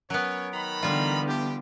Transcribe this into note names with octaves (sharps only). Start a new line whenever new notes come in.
F#3 B3 C#4 A#4 C#5
D#3 A#5 B5
D3 E3 G3 B3 F4
D4 G4